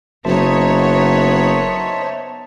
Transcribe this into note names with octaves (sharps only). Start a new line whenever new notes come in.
F#1 B3 D#4 C5 C#5 E5 A5